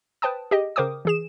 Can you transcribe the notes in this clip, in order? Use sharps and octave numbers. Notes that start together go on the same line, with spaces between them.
B4 C5 G5 A5 D#6
G4 G#4 D#5 G5
C#3 A#4 C5 G5 D6 D#6
E3 G#4 E7